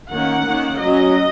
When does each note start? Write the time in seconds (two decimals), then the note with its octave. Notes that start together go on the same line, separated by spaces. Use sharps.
0.10 D#3 A#3 C#4 F#5
0.45 D#3 A#3 C#4
0.80 F#3 C#4 D#5